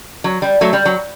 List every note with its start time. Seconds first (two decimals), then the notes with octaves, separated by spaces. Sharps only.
0.24 F#3
0.42 G3
0.61 F#3 A3
0.73 G3
0.85 F#3